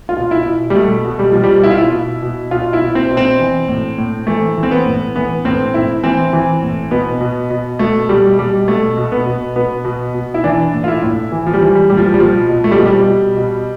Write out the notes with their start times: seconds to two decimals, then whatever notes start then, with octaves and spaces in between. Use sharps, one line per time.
0.09 F4
0.16 B2
0.31 E4
0.46 B2
0.70 G3
0.75 B2 A3
1.04 B2
1.19 G3
1.32 B2 F3
1.44 G3
1.63 B2 E4
1.70 F4
1.78 E4
1.92 B2
2.22 B2
2.51 B2 F4
2.73 E4
2.81 B2
2.95 C4
3.10 B2
3.17 C4
3.39 E3
3.68 A2
3.98 A2
4.27 E3 A3
4.57 E3
4.63 C4
4.71 B3
4.86 A2
5.15 E3 B3
5.45 A2 C4
5.74 A2 E4
6.03 E3 C4
6.33 E3
6.62 A2
6.91 B2 B3
7.21 B2
7.50 B2
7.79 B2 A3
8.09 B2 G3
8.38 B2 G3
8.67 B2 A3
8.97 B2
9.12 B3
9.26 B2
9.56 B2 B3
9.85 B2
10.14 B2
10.34 E4
10.44 E3 D4
10.73 A2
10.84 F4
10.88 E4
11.03 A2
11.32 E3
11.47 F3
11.53 G3
11.61 E3
11.75 G3
11.90 A2 G3
11.97 F3
12.14 G3
12.20 B2 F3
12.49 B2
12.64 A3
12.71 G3
12.78 B2 F3
12.86 G3
13.08 B2
13.37 B2